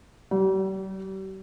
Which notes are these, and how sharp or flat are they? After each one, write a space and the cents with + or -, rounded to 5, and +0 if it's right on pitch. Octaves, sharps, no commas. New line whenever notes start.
G3 -40